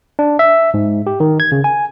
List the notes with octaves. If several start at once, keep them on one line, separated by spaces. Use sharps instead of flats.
D4
E5
G#2
G4
D#3
G#6
C#3
G#5